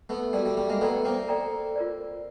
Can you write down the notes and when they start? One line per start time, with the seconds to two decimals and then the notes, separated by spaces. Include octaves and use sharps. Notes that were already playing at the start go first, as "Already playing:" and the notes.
0.09 A3 B3
0.33 G3 A3 F#4 A#4 D5
0.45 G3 A3
0.57 G3 A3
0.69 G#3 A#3
0.81 A3 B3 A4 D5 G5 A#5
1.04 A#3 C4
1.28 A4 D5 G5 A#5
1.76 F4 A#4 D5